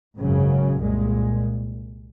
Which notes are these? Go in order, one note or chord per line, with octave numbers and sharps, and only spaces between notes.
G#1 F#2 C#3 F#3
C2 A#2 G#3